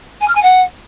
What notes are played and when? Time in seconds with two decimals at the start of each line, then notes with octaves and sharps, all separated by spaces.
0.20 G#5
0.27 F6
0.35 G#5
0.42 F#5